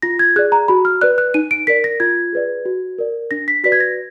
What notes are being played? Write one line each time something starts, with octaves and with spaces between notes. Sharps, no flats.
F4 A#6
G#6
G#4 D5 F#6
A#5
F#4 B5
F6
B4 D5 F#6
F#6
D#4 D#7
D7
A#4 D5 B6
A#6
F4 G#6
G#4 B4 D5
F#4
A#4 D5
D4 A#6
B6
F#4 B4 D5 B6
G#6
A#6